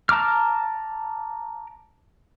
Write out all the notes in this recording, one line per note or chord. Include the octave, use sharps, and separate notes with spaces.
A5 A#5 D6 F6